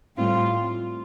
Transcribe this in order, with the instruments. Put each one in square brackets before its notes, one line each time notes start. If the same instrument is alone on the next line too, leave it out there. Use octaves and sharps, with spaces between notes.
[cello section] A2 G3 C4 F4